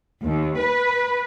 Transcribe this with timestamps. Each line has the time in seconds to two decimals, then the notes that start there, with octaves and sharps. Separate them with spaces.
0.23 D#2
0.59 B4